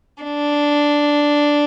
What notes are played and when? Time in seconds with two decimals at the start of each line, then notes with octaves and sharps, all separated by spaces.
0.23 D4